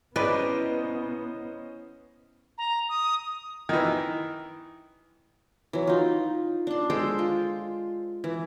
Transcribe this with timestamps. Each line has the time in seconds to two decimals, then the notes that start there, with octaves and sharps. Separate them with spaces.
0.16 B3 C#4 E4 B4 C5 D5 D#5
2.58 A#5
2.89 D#6
3.69 D#3 E3
5.73 E3 F#3
5.87 D#4 F4
6.67 D4 C6
6.90 G#3 A4 C5 G5
7.19 F4
8.24 E3